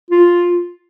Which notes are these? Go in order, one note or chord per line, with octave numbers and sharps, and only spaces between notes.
F4